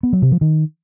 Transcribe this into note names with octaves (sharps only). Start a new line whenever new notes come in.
B3
F#3
C3
F3
D#3